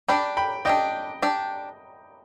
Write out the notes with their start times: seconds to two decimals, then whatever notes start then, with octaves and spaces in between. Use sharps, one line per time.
0.08 D4 G4 D5 G5 B5
0.37 G5 B5
0.65 D4 G4 D5 D#5 G5
1.22 D4 G4 D5